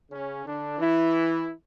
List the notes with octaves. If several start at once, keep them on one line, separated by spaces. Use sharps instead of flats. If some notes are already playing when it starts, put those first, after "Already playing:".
C#3 C#4
D3 D4
E3 E4